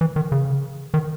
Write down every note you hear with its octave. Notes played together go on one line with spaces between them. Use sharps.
E3
D#3
C#3
D#3